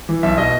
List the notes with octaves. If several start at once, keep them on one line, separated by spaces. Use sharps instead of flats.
E3
B1 E5
B2 D#5